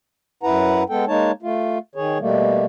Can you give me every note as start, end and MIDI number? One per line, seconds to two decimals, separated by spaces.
0.43 0.83 42
0.43 0.83 64
0.43 0.83 71
0.43 0.83 78
0.43 0.83 82
0.89 1.05 56
0.89 1.05 59
0.89 1.05 69
0.89 1.05 79
1.07 1.32 56
1.07 1.32 58
1.07 1.32 63
1.07 1.32 73
1.07 1.32 81
1.42 1.78 57
1.42 1.78 65
1.95 2.18 51
1.95 2.18 68
1.95 2.18 73
2.19 2.66 47
2.19 2.66 55
2.19 2.66 57
2.19 2.66 58